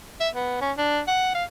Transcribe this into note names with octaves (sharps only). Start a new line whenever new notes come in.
E5
B3
C#4
D4
F#5
F5